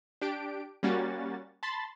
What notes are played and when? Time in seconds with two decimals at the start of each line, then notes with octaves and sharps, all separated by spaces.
0.21 D4 G4 D7
0.83 G3 A#3 C#4 F#4 A6
1.63 A5 B5 C6 A6